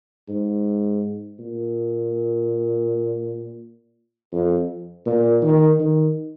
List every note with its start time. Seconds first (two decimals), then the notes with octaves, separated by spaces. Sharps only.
0.29 G#2
1.39 A#2
4.33 F2
5.06 A#2
5.42 D#3
5.80 D#3